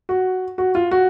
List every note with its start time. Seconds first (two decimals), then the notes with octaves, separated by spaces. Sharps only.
0.09 F#4
0.58 F#4
0.75 F4
0.91 F#4